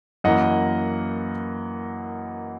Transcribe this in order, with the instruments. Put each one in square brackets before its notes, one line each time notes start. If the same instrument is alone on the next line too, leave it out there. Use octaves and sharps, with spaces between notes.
[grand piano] F#2 E3 A#3 D#5 F#5